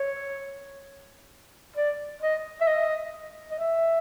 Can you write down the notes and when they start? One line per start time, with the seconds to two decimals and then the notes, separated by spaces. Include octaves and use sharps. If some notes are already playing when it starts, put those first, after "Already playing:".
Already playing: C#5
1.76 D5
2.22 D#5
2.61 E5
2.67 D#5
3.51 D#5
3.59 E5